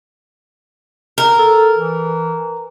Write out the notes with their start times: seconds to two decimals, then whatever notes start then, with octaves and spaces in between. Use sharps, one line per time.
1.18 A#4
1.38 A4
1.76 E3